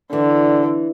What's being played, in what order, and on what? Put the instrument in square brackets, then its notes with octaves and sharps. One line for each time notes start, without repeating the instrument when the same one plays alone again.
[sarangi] D3 [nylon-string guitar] E3